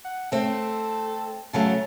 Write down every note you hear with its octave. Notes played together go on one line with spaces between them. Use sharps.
F#5
A3 C4 A4
C#3 F#3 A3 A5